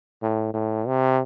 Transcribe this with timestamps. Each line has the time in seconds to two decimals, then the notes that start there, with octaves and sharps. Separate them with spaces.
0.23 A2
0.54 A2
0.87 C3